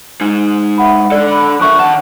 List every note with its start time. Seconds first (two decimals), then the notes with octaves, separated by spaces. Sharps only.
0.21 G#3 D#4
0.78 E5 F#5 B5
1.12 D4 A4 D5
1.31 B5
1.61 F3 A#4 E5 C#6 F#6
1.79 D#3 F#5 A5 E7